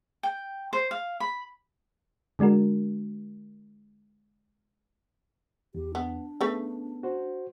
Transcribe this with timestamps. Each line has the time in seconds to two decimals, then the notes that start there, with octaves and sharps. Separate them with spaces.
0.23 G5
0.73 C5
0.91 F5
1.20 B5
2.39 D3 G#3 D4 F#4 A#4
5.75 E2 G4
5.95 B3 D4
6.41 C#3 A3 B3 B4
7.03 F#4 C5